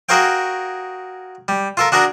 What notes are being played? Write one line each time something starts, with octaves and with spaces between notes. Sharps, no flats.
F#4 G#4 A#4 C#5 F5 G5
G3
F4 A4 A#4
D4 F#4 G#4 A#4 A#5